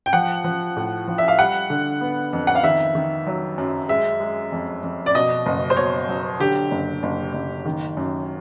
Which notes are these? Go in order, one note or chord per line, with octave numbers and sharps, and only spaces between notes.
G5
F3 F#5
F3
A2
F3
E5
F5
G3 F#5
D3
B3
F2
F#5
F5
D#3 E5
D#3
F#3
F#2
G#3 E5
G#3
F2
F2
D5
B2 D#5
F#1
C5
B2 C#5
F#3
D3 G4
F#1
F#1
F#1
D#3
F#2